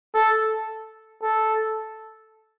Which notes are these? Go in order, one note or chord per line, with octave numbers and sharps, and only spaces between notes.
A4
A4